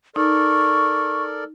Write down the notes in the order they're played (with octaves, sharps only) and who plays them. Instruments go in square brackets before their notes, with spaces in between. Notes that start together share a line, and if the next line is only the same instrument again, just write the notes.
[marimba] D#4 [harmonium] A4 A#4 D5 [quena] C#6